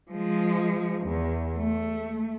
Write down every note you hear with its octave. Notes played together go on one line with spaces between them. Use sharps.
F3 G#3
E2
A3